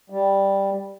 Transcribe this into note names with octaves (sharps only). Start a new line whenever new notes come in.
G3